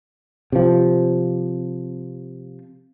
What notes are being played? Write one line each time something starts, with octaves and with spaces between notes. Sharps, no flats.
C3 F3